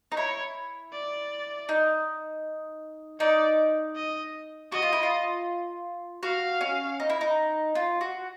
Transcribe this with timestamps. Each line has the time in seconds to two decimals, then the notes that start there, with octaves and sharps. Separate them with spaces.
0.12 D#4
0.17 E4 C#5
0.93 D5
1.69 D#4
3.20 D#4 D5
3.96 D#5
4.72 F#4 D#5
4.82 F4
4.93 E4
5.03 F4
6.23 F#4 F5
6.61 C#4
7.00 D#4
7.10 E4
7.21 D#4
7.75 F4
8.01 F#4